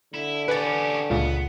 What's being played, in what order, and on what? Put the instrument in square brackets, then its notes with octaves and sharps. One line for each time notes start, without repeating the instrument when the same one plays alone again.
[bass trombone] D3 [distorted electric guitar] E4
[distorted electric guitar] C#4 G4 [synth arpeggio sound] B4 D5
[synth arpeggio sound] C#2 A#2 C#3 [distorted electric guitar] B3